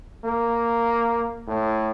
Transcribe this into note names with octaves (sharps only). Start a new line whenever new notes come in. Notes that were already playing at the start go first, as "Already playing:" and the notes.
A#3
A2